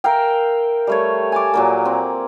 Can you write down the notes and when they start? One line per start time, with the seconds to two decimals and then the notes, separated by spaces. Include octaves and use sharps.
0.04 A#4 E5 F5 G5
0.87 G3 A3 C#5
1.32 G#5 A5 D6
1.54 A#2 F#3 A#3
1.85 C4